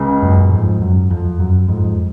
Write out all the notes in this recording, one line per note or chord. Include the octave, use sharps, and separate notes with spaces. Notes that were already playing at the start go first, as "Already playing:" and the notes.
Already playing: C#2 C#3
F#2 A#2
F2 G#2
F#2
F2
F#2
F2 G#2